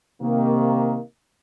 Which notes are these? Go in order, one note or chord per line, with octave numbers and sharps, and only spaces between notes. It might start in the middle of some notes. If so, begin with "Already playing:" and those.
C3 D#3 A#3